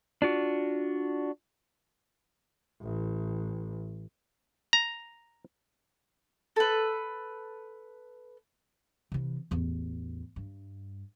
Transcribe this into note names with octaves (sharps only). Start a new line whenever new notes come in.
D4 F4 F#4
A1
A#5
A4 B4
C3 E3
A1 E2
G2